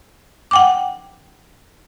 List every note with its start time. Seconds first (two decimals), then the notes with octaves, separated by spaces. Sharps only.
0.51 F#5 G5 D6